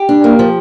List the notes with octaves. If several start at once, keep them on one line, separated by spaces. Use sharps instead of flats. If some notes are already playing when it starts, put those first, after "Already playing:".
Already playing: G4
D4
A#3
F3